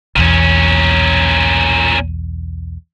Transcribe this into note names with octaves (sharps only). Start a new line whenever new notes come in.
B1 E2 A#2 C#4